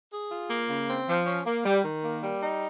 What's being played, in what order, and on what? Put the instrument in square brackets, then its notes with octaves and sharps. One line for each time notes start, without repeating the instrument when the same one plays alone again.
[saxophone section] G#4
F4
A#3
C#3
C4
F3
C#4
A#3
G3
D#3
A#3
G3
D#4